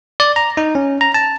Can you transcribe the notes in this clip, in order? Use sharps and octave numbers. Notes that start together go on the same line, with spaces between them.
D5
A#5
D#4
C#4
A#5
A5